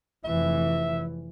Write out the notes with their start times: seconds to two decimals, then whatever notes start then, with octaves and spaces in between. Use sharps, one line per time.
0.24 F1 E3 E5